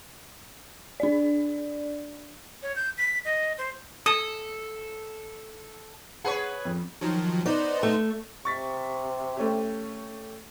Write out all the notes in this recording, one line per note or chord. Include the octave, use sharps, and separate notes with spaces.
D4 D5
C#5
G6
B6
D#5
C5
A4 D#6
G#4 B4 C#5 F#5
F2
D#3 F3 F#3
B3 D#4 C5 D5
A3
C3 C#6 A6 B6
A3 C#4 G4